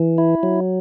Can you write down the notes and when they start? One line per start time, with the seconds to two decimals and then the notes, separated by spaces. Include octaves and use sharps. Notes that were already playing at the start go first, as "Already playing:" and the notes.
Already playing: E3
0.18 E4
0.43 F#3